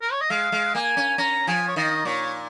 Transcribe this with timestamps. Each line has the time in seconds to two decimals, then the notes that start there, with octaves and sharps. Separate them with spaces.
0.02 A#4
0.12 C#5
0.21 D#5
0.30 G#3 F5
0.52 G#3
0.75 A#3 G#5
0.97 C#4
1.18 C#4 A#5
1.47 F3 G#5
1.68 C#5
1.76 D#3 D#5
2.05 A#2 C#5